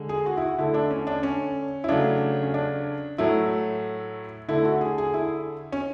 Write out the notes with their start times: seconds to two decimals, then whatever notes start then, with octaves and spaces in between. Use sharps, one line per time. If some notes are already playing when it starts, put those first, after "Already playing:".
Already playing: D3 G#3
0.09 G#4
0.26 F#4
0.37 E4
0.42 F#4
0.58 D3 A3 E4
0.74 D4
0.90 C#4
1.07 D4
1.23 C#4
1.84 E4
1.89 C#3 F#3 A3 D4
2.43 C#4
2.54 D4
3.18 A2 F#3 A3 E4
4.48 D3 A3 E4
4.65 F#4
4.81 G#4
4.98 G#4
5.14 E4
5.72 C#4